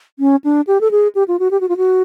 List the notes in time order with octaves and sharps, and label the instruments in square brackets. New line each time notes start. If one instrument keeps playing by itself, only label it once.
[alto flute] C#4
D4
G4
A4
G#4
G4
F4
F#4
G4
F#4
F4
F#4